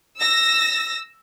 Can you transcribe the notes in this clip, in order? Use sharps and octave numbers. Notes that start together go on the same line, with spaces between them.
E6 A#6